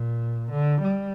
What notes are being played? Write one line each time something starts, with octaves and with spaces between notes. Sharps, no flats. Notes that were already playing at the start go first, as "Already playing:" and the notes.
Already playing: A#2
D3
G3